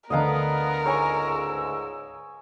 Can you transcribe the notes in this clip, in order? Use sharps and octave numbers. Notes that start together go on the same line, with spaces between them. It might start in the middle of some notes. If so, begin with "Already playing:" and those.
D2 D3 B3 A#4 D#5 F5 A#5
C#2 G#2 C#5 G#5 C#6 E6